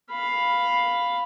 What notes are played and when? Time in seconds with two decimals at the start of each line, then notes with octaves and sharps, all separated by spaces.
0.11 F5 B5